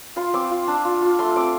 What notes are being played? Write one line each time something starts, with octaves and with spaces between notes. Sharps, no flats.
F4 C6
C4 D6
F4
D4
F4
F4
A3 C6
C4 D6